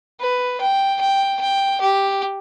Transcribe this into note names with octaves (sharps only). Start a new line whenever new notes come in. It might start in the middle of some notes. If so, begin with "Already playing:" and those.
B4
G5
G5
G5
G4